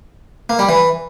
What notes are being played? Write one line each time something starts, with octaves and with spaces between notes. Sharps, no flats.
A#3
G3
E3